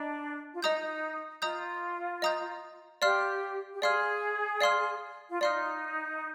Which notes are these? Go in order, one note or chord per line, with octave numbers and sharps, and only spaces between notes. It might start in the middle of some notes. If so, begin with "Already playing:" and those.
Already playing: D4 D#5 A#5
F4
D#4 D#5 A#5 D#6 G6
F4 D#5 A#5 D#6 G6
D#5 A#5 D#6 G6
G4 D5 F5 C6 F6
G4
G#4 D5 F5 C6 F6
D5 F5 C6 F6
F4
D#4 D5 F5 C6 F6